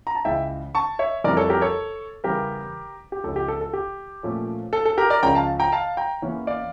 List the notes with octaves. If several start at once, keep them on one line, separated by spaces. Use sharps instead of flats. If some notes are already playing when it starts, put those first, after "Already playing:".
A#5
A5
C#2 C#3 E3 E5 G5
A5 C#6
C#5 E5
F2 E3 G3 A#4 D5
A4 C#5
G4 A#4
A4 C#5
E2 C#3 G3 C#4 G4 A#4
G4
C#2 C#3 F3 C#4 A4
G4
A4
A4
G4
A#2 F3 A3 C#4
A4
A4
G4 A#4
A#4 D5
C#2 C#3 F3 C#4 G5 A#5
F5 A5
G5 A#5
F5 A5
G5 A#5
E2 E3 A#3 C#4
D5 F5